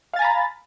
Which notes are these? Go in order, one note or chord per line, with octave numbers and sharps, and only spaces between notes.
F5 G#5 A#5 B5 A6